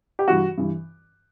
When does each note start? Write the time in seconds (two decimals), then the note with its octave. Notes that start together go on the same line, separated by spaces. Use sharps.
0.19 G4
0.28 G2 E3 F#4
0.58 G2 E3